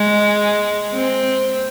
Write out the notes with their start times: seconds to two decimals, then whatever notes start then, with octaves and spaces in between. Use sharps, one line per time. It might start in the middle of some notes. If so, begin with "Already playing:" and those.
Already playing: G#3
0.95 C4